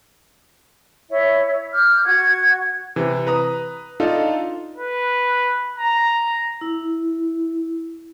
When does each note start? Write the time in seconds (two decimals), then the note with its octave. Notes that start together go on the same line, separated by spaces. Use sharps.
1.09 E4 C#5 E5
1.71 D6 F6 G6
2.03 F#4 F#5 G#6
2.96 C3 E3
3.27 B4 A#5 D#6
4.00 D4 D#4 F4 A4
4.76 B4
5.78 A#5
6.61 E4